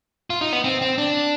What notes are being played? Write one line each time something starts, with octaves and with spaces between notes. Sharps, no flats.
F4
D#4
B3
C4
C4
D4